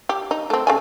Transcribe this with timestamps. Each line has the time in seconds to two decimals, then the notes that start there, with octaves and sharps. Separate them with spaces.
0.09 G4
0.31 D#4
0.50 A3 C4
0.67 C#3 A3 G#5